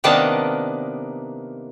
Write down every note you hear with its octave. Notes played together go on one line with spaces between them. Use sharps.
C3 D#3 A#3 B3 D4 A5